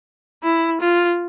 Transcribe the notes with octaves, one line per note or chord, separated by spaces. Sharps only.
E4
F4